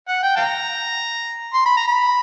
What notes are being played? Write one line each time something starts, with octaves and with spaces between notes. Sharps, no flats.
F#5
G5
F5 G5 A#5
C6
B5
A#5
B5